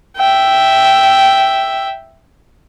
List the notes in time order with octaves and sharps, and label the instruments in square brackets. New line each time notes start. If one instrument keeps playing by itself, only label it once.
[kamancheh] E5 G5